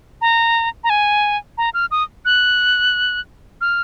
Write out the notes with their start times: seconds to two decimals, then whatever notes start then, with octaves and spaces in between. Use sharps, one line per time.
0.21 A#5
0.84 A#5
0.90 G#5
1.58 A#5
1.74 F6
1.91 D#6
2.25 F#6
3.61 F6